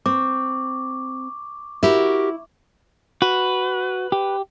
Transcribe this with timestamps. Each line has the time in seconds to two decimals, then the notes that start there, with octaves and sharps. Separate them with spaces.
0.06 C4 C#6 D6
1.83 E4 F#4 G4 A#4
3.22 F#4 B4
4.12 G4